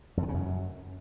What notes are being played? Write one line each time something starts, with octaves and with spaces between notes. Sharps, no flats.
F2
D#3
C#3
F#2